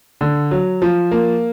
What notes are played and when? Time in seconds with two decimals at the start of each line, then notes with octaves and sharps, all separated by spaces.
0.21 D3
0.51 F#3
0.82 F3
1.11 A#3